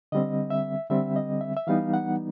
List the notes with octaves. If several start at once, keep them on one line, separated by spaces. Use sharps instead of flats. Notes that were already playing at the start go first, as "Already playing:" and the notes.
D3 G3 C4 D#5
E5
D3 G3 C4 E5
D#5
E5
E5
E3 G3 B3 D#4 F5
F#5